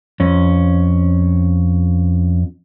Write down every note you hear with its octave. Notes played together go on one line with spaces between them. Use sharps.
F2 C#4